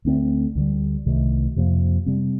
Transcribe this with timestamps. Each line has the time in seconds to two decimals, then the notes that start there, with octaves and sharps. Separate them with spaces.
0.05 D2 D3 A3 C4
0.55 D2 D3 G3
1.06 C2 C3 D#3 A3
1.56 F2 C3 F3 A#3
2.06 C3 G3 C4